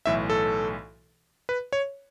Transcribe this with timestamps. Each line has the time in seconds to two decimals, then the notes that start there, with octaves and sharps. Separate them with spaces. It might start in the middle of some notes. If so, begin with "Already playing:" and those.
0.06 B1 A2 E3 E5
0.30 A4
1.49 B4
1.73 C#5